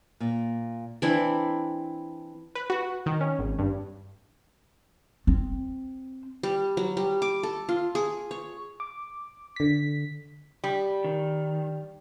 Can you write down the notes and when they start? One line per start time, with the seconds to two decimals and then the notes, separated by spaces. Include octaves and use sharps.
0.20 A#2
1.02 E3 C4 D4 E4
2.55 B4
2.70 F#4
3.06 D#3
3.21 C#4
3.39 G#1
3.59 G2
5.27 C4
6.43 G3
6.77 F#3
6.97 G3
7.22 D6
7.43 A4
7.69 F4
7.95 G#4
8.31 C#5
8.80 D6
9.56 D3 B6
10.64 G3
11.04 D#3